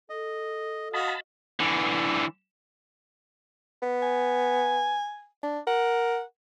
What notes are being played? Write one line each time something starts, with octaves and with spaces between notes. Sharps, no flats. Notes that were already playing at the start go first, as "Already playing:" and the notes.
A4 D#5
F#4 D#5 F5 A5 B5
D3 E3
B3
G#5
D4
A#4 F#5